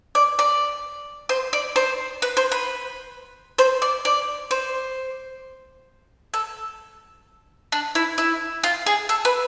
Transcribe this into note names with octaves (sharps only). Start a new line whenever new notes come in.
D5
D5
C5
D5
C5
B4
C5
B4
C5
D5
D5
C5
A4
D4
E4
E4
F4
G#4
A4
B4